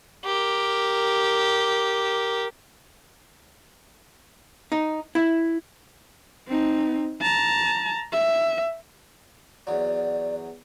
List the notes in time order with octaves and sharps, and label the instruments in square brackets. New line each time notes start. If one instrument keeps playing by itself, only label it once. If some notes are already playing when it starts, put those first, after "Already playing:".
[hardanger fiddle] G4 A#4
[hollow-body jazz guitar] D#4
E4
[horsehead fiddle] C4 D#4
A5 A#5
E5
[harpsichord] E2 F#3 [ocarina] D5